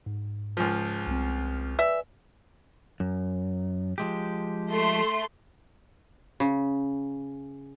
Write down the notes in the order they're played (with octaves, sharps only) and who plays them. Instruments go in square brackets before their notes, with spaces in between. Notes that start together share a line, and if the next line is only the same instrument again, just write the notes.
[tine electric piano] G#2
[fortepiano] C#2 F3
[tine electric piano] C2 C4
[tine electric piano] B4 D5 G#5 [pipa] E5
[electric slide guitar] F#2
F3 G#3 G4
[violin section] A3 C6
[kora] C#3